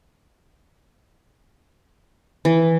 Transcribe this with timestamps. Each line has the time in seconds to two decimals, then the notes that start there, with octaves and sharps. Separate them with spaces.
2.45 E3